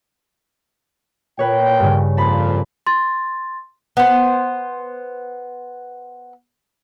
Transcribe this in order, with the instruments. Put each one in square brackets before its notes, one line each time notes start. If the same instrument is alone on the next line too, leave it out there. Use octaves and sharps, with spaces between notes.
[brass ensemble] A#2 G5 [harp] B4 C#5
[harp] G2 C#3
[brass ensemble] F2 A#2 F3 [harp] A5 B5
[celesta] C6 A6
[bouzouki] B3 C5